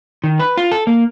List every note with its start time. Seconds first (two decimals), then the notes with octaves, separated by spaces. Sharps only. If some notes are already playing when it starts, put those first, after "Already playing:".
0.24 D#3
0.39 B4
0.57 F4
0.71 A4
0.87 A#3